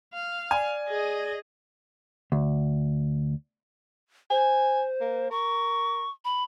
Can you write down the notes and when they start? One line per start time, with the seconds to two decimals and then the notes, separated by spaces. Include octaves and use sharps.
0.13 F5
0.51 D5 G#5
0.89 G#4 D#5
2.32 D2
4.31 C5 G#5
5.01 A#3
5.31 A#4 C#6
6.25 B5